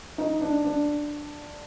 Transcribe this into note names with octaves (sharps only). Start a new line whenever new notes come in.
D#4
D4
D4